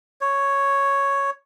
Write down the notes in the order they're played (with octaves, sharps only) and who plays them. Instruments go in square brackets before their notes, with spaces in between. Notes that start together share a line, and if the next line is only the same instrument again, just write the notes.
[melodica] C#5